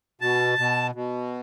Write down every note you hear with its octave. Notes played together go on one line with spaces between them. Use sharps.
B2 A5
B2
B2